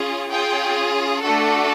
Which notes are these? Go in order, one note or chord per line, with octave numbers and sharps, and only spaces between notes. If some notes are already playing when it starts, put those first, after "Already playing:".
Already playing: C#4 F4 G#4
C#4 F4 G#4 G5
A3 D4 F#4 A4